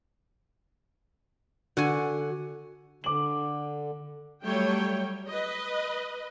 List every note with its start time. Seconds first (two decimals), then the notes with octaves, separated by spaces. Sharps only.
1.77 D3 F#4 G#5
3.04 D3 D6 F#7
4.44 F#3 G3 A3 C#5 G5
5.28 B4 D#5